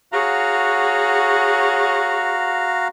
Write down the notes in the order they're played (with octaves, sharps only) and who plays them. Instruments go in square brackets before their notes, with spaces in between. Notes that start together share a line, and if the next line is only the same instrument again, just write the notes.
[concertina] F#4 F5 A#5 [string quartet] G#4 C#5 F#5